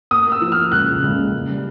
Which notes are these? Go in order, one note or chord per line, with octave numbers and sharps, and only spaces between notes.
A#3 D#6
A#3
E6
F3
F6
A#3
C#2 F#6
C#2
C#2
A#3
C#2
G3